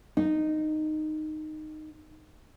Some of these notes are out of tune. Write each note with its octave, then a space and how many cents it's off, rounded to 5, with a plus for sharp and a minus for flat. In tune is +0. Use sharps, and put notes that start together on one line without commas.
D#4 -10